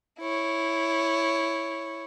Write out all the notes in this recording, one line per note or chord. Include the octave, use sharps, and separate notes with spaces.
E4 C#5